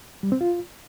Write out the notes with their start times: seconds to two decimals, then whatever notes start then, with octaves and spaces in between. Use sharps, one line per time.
0.23 G3
0.32 C4
0.41 F4